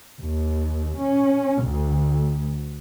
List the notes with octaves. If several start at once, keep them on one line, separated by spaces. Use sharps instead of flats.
D#2
C#4
D2